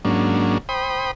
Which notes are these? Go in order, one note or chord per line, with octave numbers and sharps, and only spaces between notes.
G#2 F#3 A#3 C#4 D4
C5 G5 B5 D#6